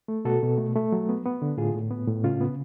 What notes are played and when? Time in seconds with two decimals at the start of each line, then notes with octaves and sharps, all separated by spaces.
0.08 A3
0.25 B2 F#4 A4
0.43 B2
0.58 A3
0.76 A3
0.92 F#3
1.09 B3
1.26 B3
1.42 D3
1.58 A2 F4 G#4
1.75 A2
1.91 B3
2.07 A2
2.24 C#3 C#4 F4
2.41 B3